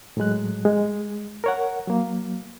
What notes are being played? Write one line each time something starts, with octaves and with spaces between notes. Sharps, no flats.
A2 F#3 G#3 F#6
G#3
A#4 C#5 F#5
F#3 A#3